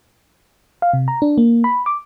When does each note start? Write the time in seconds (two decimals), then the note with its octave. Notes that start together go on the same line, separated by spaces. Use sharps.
0.82 F5
0.94 C3
1.08 A#5
1.22 D4
1.38 A#3
1.64 B5
1.86 D6